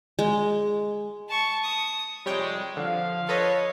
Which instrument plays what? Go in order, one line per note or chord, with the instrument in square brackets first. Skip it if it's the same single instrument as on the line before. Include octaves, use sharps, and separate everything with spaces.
[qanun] G#3
[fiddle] A5 C#6
D#6
[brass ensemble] F2 C3 G#3 [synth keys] G3 C#5 G5
[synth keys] D3 [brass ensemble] F3 F5
[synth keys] A4 B4 D#5 [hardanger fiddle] C#5